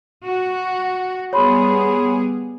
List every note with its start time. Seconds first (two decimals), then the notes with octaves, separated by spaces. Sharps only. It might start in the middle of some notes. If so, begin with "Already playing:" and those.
0.24 F#4
1.33 G3 B3 G#4 C#5 B5 C6